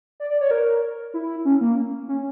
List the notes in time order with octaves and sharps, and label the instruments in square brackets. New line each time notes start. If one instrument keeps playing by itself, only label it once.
[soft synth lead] D5
D5
C#5
A#4
E4
C#4
A#3
C#4